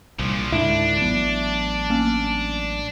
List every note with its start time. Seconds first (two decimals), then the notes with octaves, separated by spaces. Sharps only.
0.19 C2 A#2 F3
0.52 C#2 G#2 D3 D4 E4 E5
1.01 A1 F#3 B3
1.90 A#3 C#4